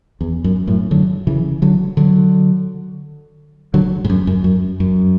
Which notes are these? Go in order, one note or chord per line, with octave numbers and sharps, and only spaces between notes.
E2
F#2
F#2 A2
D3 F#3
C#3 E3
D3 F#3
D3 F#3
D3 F#3
G#2
F#2
F#2
F#2
F#2